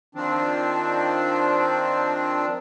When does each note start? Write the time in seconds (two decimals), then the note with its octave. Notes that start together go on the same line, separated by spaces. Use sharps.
0.15 D#3 F3 C4 D4